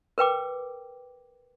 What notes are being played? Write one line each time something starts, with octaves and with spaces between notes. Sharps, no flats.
A#4 B4 G5 D6